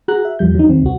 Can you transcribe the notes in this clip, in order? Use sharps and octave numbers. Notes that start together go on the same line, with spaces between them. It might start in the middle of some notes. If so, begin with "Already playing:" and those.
F#4 G#4 A#5 F#6
E5
E2 F3 G3 G6
F#3 D#4
D#2 C4
C2 F#4